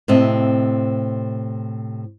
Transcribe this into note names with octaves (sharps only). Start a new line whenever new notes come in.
A2 C3 C4 D#5